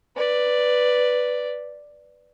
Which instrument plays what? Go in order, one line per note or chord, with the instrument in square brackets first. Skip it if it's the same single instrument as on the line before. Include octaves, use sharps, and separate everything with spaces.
[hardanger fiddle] B4 D5